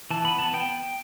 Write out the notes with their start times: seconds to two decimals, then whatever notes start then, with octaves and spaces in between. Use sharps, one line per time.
0.10 E3 A5
0.24 B3 B5
0.39 B3 A5
0.53 B3 G5